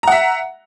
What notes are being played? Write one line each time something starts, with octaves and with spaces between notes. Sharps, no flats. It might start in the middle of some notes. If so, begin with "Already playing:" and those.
E5 F#5 A#5